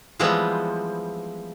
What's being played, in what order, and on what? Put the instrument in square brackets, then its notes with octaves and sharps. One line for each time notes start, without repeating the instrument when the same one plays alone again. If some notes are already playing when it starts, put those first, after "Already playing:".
[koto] E3 F3 G3 G#3 B3 C4